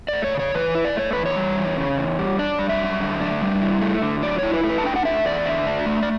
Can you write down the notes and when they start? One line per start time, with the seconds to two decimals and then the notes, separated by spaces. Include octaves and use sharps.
0.08 A3 D5
0.24 C#5
0.35 C#3 C#5
0.54 E3 B4
0.75 E4
0.85 D5
0.96 A3 C#5
1.13 E2 B4
1.26 C#5
1.37 G3
1.57 E2
1.77 C#3
1.98 E2
2.19 G3
2.39 D4 D5
2.59 G3
2.69 E5
2.80 F#2
3.01 D3
3.21 D4
3.42 G3
3.62 E4
3.81 A3
4.02 D3
4.23 F#3 D5
4.39 E4 C#5
4.53 B4
4.64 A3
4.69 B4
4.78 A5
4.84 D4 G5
4.96 F#5
5.05 A3 E5
5.25 E2 D5
5.46 D3 E5
5.67 D4
5.86 A3
6.03 D5